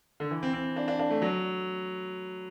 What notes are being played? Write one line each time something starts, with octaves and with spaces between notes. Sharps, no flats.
D3
E3
C4
C4
D4
D4
D4
A3
F#3